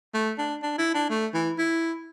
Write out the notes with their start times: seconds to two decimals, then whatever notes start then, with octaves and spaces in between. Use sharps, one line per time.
0.14 A3
0.38 D4
0.62 D4
0.78 E4
0.94 D4
1.10 A3
1.34 E3
1.58 E4